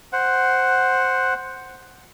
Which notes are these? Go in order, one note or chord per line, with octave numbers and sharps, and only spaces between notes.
C5 F#5